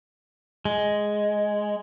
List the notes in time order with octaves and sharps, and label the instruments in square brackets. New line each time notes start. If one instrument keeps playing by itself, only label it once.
[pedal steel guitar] G#3